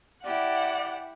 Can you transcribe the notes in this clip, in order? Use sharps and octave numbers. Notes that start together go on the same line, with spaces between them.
E4 G4 D5 F#5